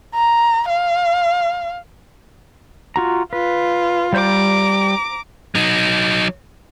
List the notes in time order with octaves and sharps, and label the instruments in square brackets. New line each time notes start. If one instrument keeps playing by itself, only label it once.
[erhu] A#5
F5
[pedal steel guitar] F4 F#4 A#5
[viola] F4 [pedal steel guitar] B4
[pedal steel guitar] G3 D5 G6 [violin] A#5 D6
[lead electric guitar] F#3 D#4